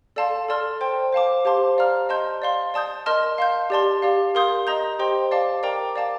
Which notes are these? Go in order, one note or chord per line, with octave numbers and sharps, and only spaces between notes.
A4 D5 F5 A5 C6
A4 D5 A5 C6 F6
C5 G5 C6
C5 F5 A5 D6
G4 C5 F5 A5 C6
D5 F5 A#5 F6
D#5 A5 C6 G6
D5 F5 C6
D5 A5 D#6 G6
A#4 D#5 A5 C6 F6
F5 C6 G6
G4 D5 A5 C6
G4 D5 F5
A#4 F5 C6 D#6 G6
D#5 A#5 D#6 G6
G4 C5 D#5 G5 C6
D5 F5 A5 D6
A#4 D5 G5 A#5 D6
D5 F5 A5 D6